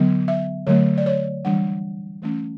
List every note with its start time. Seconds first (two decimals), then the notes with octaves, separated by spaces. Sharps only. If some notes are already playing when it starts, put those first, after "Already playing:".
Already playing: D3 F#3 B3
0.28 E5
0.67 D3 F#3 A3 C#5
0.98 D5
1.06 C#5
1.45 E3 G3 D4 F#5
2.22 E3 A3 C#4